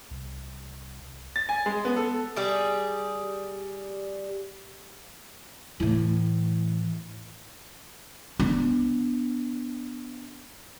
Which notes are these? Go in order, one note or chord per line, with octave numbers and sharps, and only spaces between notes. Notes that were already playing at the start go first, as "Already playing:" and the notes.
C2
A6
G#5
G#3
B3
A4
G3 G4 G#4
A2 E3
B3 D4